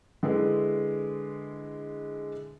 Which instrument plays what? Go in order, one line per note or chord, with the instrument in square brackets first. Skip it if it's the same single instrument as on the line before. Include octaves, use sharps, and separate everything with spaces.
[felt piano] D3 G#3 E4 B4